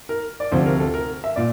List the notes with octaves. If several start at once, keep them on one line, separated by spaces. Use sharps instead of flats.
A#4
D5
D2 C3 F3 C5
A#4
A4
A#4
E5
A#2 D5